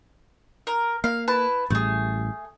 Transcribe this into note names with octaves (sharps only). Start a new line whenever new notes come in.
A#4
A#3 F5
E4 B4 A5
A1 A2 G3 A3 G#4